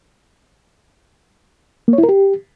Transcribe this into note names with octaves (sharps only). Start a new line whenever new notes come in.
A#3
C#5
E4
A#4
G4